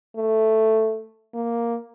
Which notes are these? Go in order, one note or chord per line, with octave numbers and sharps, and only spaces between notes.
A3
A#3